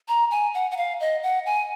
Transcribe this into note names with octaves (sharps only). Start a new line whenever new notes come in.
A#5
G#5
F#5
F#5
F5
D#5
F#5
G#5